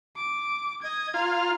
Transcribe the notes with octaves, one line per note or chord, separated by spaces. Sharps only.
D6
D#5 G#6
F4 A#5